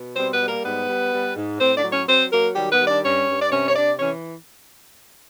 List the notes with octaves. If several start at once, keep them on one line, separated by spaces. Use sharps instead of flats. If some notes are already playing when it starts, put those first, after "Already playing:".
Already playing: B2
G3 C4 C5
B3 B4
G3
A#3 A#4
G#2 B3 B4
G3
G3
G#2
A2 C4 C5
D4 D5
F#3
C#4 C#5
F#3 C4 C5
F#3 A#3 A#4
D#3 G3 G4
B3 B4
G3
D4 D5
G2 C#4 C#5
G2
D5
C3 C#4 C#5
C#5
C3 D4 D5
E3 C#4 C#5